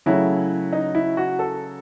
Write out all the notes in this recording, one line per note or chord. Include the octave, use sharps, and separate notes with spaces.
C#3 F#3 A3 E4
D#4
E4
F#4
A4